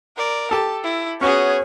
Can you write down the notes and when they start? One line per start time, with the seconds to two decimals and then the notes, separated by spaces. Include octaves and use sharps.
0.17 A#4 D5
0.51 G4 A4 A5
0.84 E4
1.21 B3 C#4 F#4 G#4 C#5 G#5